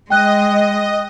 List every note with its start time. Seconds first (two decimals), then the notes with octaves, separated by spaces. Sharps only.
0.10 G#3 D#5 G5 F#6